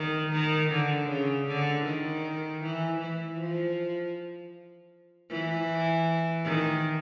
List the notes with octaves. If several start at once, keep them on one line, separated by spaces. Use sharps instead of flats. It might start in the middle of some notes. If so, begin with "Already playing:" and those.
Already playing: D#3
D#3
D3
C#3
D3
D#3
E3
E3
F3
E3
D#3